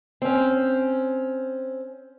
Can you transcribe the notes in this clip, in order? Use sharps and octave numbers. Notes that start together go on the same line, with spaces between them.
C4 C#4